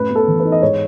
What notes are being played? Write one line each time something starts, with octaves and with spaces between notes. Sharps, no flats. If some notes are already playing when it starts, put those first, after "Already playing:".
Already playing: F#2 A2 B4
B3
A4
E3
B4
D#4
D#5
G#2 C#5